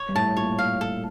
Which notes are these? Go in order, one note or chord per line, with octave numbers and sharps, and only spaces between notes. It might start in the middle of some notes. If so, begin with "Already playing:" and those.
Already playing: C#5
G2
A2 A5
A#2 C#5
F5
A4